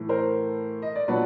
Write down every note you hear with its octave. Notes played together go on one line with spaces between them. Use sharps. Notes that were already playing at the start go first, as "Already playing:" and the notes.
Already playing: A2 E3 A3
A#4 C5
D#5
D5
A#2 F#3 B3 D4 B4 C#5